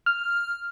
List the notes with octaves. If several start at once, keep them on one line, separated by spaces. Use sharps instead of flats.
F6